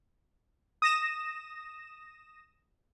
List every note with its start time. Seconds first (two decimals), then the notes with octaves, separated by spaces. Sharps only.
0.82 D#6 A#6 E7